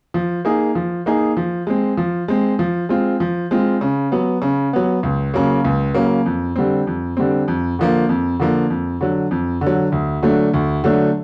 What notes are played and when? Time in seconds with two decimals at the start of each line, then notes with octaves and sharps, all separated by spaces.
0.14 F3
0.45 A#3 D#4 G#4
0.75 F3
1.06 A#3 D#4 G#4
1.37 F3
1.67 G#3 C4
1.97 F3
2.28 G#3 C4
2.59 F3
2.89 G#3 C4 F4
3.20 F3
3.51 G#3 C4 F4
3.81 C#3
4.12 F#3 B3
4.42 C#3
4.73 F#3 B3
5.03 C#2
5.34 C#3 F#3 A#3
5.64 C#2
5.94 C#3 F#3 A#3
6.26 F2
6.56 D3 G3 C4
6.87 F2
7.17 D3 G3 C4
7.48 F2
7.79 D3 F3 A#3
8.09 F2
8.40 D3 F3 A#3
8.70 F2
9.01 D3 F#3
9.31 F2
9.61 D3
9.66 F#3
9.92 D2
10.23 D3 F#3 A3 D4
10.54 D2
10.84 D3 F#3 A3 D4